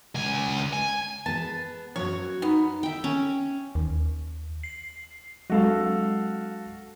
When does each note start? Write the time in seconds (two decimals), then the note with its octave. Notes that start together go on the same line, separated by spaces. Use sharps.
0.15 C#2 G#5
0.73 G#5
1.26 B3 G#4 A5
1.96 F#2 F#4 C#5 F#5
2.42 B3 D#4
2.83 E5 G5
3.04 C#4
3.75 D#2
4.63 C7
5.50 F#3 G#3 F#4 A4 F5